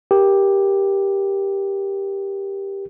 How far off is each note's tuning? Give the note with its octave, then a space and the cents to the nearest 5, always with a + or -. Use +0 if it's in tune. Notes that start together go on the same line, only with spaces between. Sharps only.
G4 +5 A#4 +20